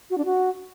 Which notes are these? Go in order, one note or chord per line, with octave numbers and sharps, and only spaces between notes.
F#4
D4
F#4